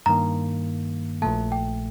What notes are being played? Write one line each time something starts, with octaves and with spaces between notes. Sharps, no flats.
G2 D#3 A#3 A#5
A#1 A#2 A3 A5
G5